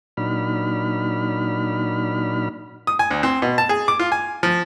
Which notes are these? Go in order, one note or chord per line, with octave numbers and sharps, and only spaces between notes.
A#2 F#3 D4 D#4 B5 F6
D#6
G#5
D2
C4
B2
A5
G#4
D6
F4
G#5
F3